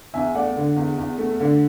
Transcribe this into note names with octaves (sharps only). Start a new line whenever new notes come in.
E2 E5 G#5
A3 D5 F#5
D3
E2
E2
A3
D3